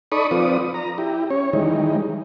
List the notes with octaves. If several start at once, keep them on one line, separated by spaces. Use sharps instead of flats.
D#4 A4 D5 B5 C#6 D#6
F3 C4 F4 B4 D5 D#6
A#5
E4 G4
C#4 C#5
D#3 E3 G3 G#3 D#4